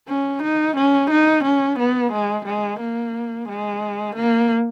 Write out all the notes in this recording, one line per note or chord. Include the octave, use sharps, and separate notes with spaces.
C#4
D#4
C#4
D#4
C#4
B3
G#3
G#3
A#3
G#3
A#3